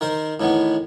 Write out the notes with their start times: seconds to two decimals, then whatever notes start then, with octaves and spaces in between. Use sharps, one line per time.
0.01 D#3 A#4 C5 C6
0.40 A2 D#3 E3 B3